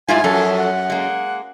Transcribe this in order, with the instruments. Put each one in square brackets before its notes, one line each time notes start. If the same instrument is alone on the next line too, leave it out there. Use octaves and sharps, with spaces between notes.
[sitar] G#2 [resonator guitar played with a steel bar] G3 E4 F4 [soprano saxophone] G#5
[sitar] F#2 [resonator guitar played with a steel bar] F3 F#3 A4
[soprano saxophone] F#5
[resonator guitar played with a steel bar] G#3 A#3